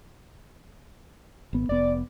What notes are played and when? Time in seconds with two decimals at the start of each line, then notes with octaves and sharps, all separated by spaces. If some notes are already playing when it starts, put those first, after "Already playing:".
1.53 G#1 B3
1.69 F1 B3 D5